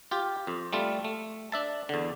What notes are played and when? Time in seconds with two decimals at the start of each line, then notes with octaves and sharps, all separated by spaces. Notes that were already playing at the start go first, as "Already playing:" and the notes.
0.11 F4 G4
0.47 F2
0.73 G3 A3 F4
1.04 A3
1.52 D4 E5 A5
1.89 E2 D3